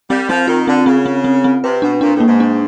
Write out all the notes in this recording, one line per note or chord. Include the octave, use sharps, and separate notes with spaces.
G3 C4
F3 C4
D#3 F4
D3 C4
C#3 C4
C4
C4
C4
C3 B4
B2 D4
A#2 D4
A2
A#3
G#2
D4